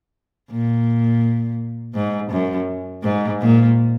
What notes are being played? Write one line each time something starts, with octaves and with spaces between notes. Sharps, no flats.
A#2
G#2
F#2
G#2
A#2